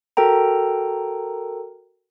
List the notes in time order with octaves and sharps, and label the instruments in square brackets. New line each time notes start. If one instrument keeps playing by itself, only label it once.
[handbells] F#4 A4 A#4 G5 A#5